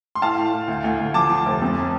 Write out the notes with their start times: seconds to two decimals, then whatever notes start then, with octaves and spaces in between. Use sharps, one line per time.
0.15 C6
0.22 A2 F5 A5
0.37 A2
0.52 A2
0.68 D2
0.84 D2
0.99 D2
1.14 F3 A5 D6
1.30 F3
1.46 F1
1.62 F2